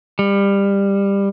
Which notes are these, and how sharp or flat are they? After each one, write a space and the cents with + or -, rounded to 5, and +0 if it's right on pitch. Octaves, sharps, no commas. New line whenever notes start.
G3 +20